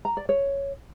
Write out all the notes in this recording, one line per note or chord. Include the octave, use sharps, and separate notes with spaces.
A#5
D5
C#5